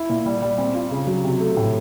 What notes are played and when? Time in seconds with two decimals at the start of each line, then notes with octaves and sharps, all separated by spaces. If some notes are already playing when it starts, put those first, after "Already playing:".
Already playing: E4
0.09 A#2
0.26 G3
0.42 G3
0.58 C4
0.75 F4
0.91 C#3
1.07 F#3
1.24 C3
1.40 A3
1.57 A2